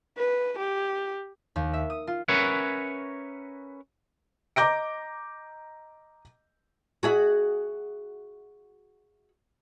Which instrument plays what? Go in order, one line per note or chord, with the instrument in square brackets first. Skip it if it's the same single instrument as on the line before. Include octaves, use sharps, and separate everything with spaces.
[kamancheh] B4
G4
[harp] D#2
E5
D#6
F4
[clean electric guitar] C#4 A#4 B4 C#5 E5 F#5
[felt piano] D#5 A#5 D6 G6 A#6 D7
[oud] F#4 G#4 E5